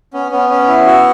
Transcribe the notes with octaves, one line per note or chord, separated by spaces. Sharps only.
B3 C#4
B3 C#4
C#4
E4
F#4